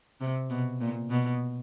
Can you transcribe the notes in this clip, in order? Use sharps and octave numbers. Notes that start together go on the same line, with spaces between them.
C3
B2
A#2
B2